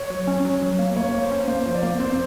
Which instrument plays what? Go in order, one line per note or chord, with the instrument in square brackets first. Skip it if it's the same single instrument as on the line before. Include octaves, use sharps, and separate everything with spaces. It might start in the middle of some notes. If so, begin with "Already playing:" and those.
Already playing: [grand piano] C#5
[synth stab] F#3
C#4
F#3
F#3
A#3
[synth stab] A#3 [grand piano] C#5
[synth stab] A#3
[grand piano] C5
[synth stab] C#4
[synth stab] A#3 [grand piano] C5
[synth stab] F3
[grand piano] D5
[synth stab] A#3
[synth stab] C4 [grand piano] C5